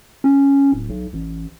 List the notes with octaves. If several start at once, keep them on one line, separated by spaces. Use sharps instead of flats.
C#4
D1
B1
A1